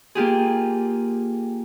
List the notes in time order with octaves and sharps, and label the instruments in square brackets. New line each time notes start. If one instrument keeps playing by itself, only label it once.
[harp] A#3 F4 G4 G#4